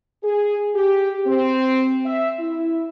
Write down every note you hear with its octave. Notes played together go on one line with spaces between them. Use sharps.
G#4
G4
C4
E5
E4